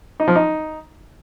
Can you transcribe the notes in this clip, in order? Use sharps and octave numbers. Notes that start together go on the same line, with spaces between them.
D#4
F3
D#4